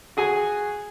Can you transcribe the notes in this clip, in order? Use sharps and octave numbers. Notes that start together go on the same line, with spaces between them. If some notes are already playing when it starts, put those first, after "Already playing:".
F#4 G#4 G#5